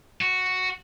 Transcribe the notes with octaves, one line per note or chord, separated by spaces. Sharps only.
F#4